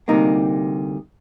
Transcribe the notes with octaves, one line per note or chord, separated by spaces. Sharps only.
D2 C3 G3 A#3 D#4